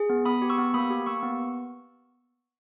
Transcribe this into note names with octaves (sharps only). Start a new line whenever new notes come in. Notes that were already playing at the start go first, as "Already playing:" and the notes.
Already playing: G#4
B3
B3 B5 D#6
G4
C#6 E6
B3
A#3 B5 D#6
G4
A#3 C#6 E6
B3